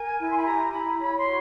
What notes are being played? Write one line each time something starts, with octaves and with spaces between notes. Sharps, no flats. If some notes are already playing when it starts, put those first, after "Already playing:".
Already playing: A#4 G#5
E4
C6
B5
G4 A#5
E4 B5
C#5 B5
C6
F#4